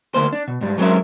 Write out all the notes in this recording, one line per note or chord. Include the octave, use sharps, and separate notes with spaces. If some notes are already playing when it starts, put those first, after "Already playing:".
D2 A#3 C5
D4
B2
G#2 G3
F#3 G#3 C4 C#4 A#4 E5